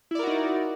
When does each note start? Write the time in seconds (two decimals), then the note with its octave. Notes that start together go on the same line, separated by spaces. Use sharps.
0.11 E4
0.15 D5
0.19 A#4
0.23 F#4
0.27 D#4